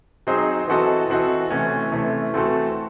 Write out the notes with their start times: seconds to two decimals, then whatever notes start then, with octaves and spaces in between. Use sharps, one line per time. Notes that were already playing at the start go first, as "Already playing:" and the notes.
0.27 F#3 C4 D#4 G#4 C5
0.68 E3 C4 F#4 A4 D#5
1.10 E3 C4 F#4 A4 D#5
1.50 C3 E3 A3 C#4
1.92 C3 E3 A3 C#4
2.34 E3 A3 C4 F#4 A4